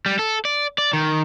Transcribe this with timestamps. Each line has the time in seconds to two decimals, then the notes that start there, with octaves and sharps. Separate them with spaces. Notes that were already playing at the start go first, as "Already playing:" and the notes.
0.06 G3
0.19 A4
0.45 D5
0.78 D5
0.93 D#3